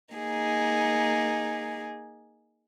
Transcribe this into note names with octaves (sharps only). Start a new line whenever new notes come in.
A#3 D#4 G#4